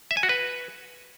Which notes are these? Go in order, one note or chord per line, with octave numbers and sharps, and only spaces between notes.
E5
G#5
F#4
B4